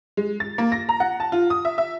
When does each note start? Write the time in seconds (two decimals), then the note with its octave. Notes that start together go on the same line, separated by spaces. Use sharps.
0.17 G#3
0.40 A6
0.58 A#3
0.72 A#6
0.89 A#5
1.00 F#5
1.20 A5
1.32 F4
1.50 D#6
1.65 E5
1.78 E5